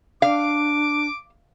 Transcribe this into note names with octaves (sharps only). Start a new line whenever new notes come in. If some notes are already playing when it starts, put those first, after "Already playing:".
D4 F5 D6